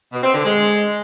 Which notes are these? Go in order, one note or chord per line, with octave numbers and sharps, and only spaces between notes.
B2
C4
D3
G#3